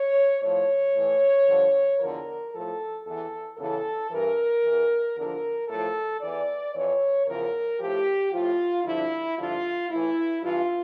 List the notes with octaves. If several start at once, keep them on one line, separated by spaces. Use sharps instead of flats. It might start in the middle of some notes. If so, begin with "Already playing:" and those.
Already playing: C#5
A2 F3 C#5
A2 E3
G2 D3 F3
E2 D3 F3 A#4
A2 F3 A4
E2 E3 A4
E2 C#3 E3 A4
G2 E3 A#4
E2 E3
E2 D3 F3 A#4
A2 F3 A4
E2 E3 D5
F2 E3 C#5
E2 C#3 F3 A#4
A2 F3 G4
A2 F3 F4
G2 D3 F3 E4
G2 D3 F3 F4
A2 E3 E4
G2 E3 F4